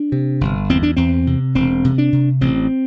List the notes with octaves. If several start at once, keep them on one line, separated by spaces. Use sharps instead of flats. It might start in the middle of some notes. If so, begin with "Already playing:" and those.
Already playing: D4
C3
G1
E2 C4
D4
E2 C4
C3
E1 C4
C3
D4
C3
A1 C4